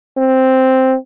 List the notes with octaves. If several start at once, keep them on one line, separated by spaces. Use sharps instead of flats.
C4